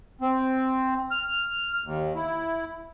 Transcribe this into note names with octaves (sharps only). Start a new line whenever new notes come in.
C4
F6
D#2
E4